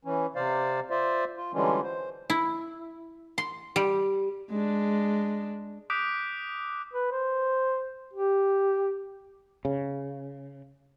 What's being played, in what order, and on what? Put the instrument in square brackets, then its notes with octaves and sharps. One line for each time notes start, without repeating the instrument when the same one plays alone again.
[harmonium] E3 C#4
C3 C5 D5 F5
F4 C5 D5 E5
F4
D3 E3 G3 G#3 C#4 F4
C5
[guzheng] E4
C6
G3
[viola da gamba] G#3 D4
[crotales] D6 D#6 F#6 G6 B6 D7
[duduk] B4
C5
G4
[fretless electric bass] C#3